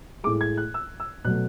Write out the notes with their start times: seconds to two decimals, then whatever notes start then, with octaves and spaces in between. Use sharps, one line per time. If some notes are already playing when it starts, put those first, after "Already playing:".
0.24 A2 G#3 D6
0.41 G#6
0.57 F#6
0.74 E6
1.00 E6
1.25 B2 F#3 A3 F#6